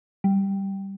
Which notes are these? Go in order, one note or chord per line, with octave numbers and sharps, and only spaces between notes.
G3